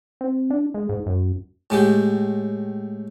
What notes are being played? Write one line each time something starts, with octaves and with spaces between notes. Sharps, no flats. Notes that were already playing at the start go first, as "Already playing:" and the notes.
C4
D4
G#3
G#2
F#2
A2 G#3 G4